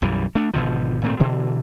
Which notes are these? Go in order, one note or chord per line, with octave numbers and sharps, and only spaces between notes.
B1 F#2 E3 G3
A3 D4
G#1 B2 D3 F3
G#1 A#2 A3 C4
B2 D3 E3